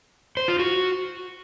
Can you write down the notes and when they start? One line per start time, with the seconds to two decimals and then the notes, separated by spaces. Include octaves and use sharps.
0.37 C5
0.48 F4
0.59 F#4